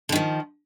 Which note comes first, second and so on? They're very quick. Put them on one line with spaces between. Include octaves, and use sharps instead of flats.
D3 D#3 F3